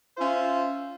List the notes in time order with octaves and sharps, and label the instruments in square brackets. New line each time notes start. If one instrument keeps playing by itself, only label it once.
[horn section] C#4 F4 C5 E5